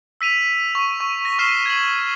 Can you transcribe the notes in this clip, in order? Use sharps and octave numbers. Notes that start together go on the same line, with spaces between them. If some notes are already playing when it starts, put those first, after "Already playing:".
E6 B6 D#7 F7
C#6
C#6
A#6
C#6 F6 C7 E7 G7
G#6 F#7